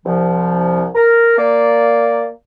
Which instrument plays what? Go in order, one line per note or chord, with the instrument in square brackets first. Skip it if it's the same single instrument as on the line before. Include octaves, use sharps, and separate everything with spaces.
[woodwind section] C2 F3
A#4
A#3 D5